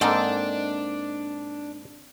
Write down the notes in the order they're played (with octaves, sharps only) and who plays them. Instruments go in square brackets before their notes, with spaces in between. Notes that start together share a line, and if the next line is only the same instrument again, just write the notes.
[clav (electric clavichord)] G#2 A#3 [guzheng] C4 D#4 A4 [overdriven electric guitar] D4